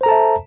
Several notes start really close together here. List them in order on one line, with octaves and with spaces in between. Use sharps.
C5 A#5 A4 A5 E5